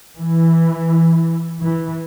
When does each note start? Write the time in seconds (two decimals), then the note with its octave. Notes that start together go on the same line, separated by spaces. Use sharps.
0.18 E3
1.63 E3